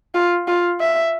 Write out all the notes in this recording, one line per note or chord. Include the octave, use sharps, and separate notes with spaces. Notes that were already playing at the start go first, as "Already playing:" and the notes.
F4
F4
E5